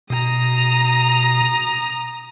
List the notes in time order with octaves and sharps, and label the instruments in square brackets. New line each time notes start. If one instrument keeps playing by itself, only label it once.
[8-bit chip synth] B2 [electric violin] A#5 D#6